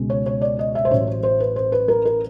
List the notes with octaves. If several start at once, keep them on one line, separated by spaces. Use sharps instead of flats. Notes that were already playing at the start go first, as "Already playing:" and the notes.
Already playing: C#2 B2 G#3
C#5
C#5
D5
D#5
E5
C5
A1 A2 F#3 C#5
C5
C5
B4
C5
B4
A#4
A#4